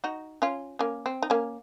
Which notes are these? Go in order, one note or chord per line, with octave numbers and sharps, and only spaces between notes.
D#4 F#4
C#4 F4
A#3 C#4
C4
D#4
A#3 C#4